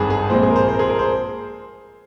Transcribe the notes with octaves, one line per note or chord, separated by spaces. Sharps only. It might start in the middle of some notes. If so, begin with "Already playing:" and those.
Already playing: G#1 G2 D#3 C4 G#4
G#4
A#1 A#2 G#3 C4 C5
G#4
A#4
C5
C5
A#4
G#4
A#4
C5